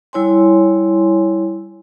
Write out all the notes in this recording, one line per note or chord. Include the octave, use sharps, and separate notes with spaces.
G3 E4 C#5 G#5 C6